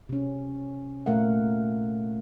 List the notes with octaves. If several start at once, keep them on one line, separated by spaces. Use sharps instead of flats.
C3 C#4
A#2 A3 A#4 F5 F#5